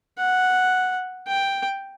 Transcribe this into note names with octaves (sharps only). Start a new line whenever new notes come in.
F#5
G5